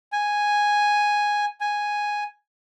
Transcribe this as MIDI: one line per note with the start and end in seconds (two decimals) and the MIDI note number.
0.12 1.45 80
1.61 2.24 80